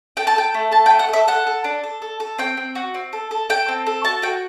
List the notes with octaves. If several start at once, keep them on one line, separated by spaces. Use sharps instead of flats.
A4 G5
A5
A4 G5
A3
A4 A5
G5
A3
F#5
A4 E5
A4 F#5
A4
D4
A4
A4
A4
C4 G5
C4
F#4
C4
A4
A4
A4 G5
C4
A4
F#4 A5
F#4 G5